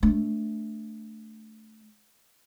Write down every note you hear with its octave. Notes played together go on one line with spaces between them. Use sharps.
A3 D4